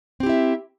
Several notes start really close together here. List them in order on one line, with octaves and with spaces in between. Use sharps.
C4 G4 E4 E5